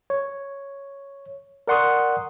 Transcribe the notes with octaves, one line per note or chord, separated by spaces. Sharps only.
C#5
A#4 D5 F#5 C6 C#6 D#6